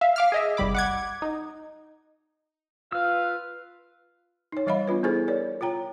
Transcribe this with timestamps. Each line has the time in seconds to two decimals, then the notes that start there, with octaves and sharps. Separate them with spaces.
0.01 E5 F5
0.16 F5 D6 F6
0.32 G#4 D#5 E5
0.57 G1 C2 G3 B5 D6
0.75 F#5 D6 G#6
1.22 D#4
2.92 F4 B4 F5 E6
4.52 D#4 C#5
4.66 E3 G3 C#5 D#5 F5 B5
4.88 B3 D4 F4 B4
5.03 B3 E4 G#4 A4 C5
5.27 A#4 C#5 D5
5.61 F4 C#5 G5 A#5